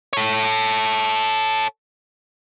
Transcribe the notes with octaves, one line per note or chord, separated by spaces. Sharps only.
A4 C#5